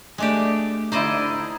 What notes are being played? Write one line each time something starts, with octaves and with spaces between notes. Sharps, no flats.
G#3 A3 D4 G4
D3 D#4 E4 C5 D5 D#5